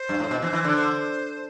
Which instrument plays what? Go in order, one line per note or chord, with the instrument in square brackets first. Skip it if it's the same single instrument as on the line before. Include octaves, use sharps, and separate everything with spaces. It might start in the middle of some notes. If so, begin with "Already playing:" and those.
Already playing: [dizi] C5
[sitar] G2
A2
B2
[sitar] E3 [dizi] C5
[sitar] E3
[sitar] D3 [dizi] D5
[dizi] C5